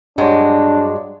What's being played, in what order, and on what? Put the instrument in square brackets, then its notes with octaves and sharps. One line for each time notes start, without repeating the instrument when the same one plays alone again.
[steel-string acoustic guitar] G2 F#3 G#3 [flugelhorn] D4